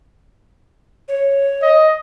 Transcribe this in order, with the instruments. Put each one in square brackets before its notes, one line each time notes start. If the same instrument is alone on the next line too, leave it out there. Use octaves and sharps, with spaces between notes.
[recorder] C#5
[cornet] D#5